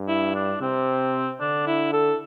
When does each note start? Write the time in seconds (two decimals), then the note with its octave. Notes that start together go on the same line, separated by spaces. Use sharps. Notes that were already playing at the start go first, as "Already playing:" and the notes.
Already playing: G2
0.08 E4
0.35 D4
0.61 C3 C4
1.40 D3 D4
1.67 E4
1.93 A4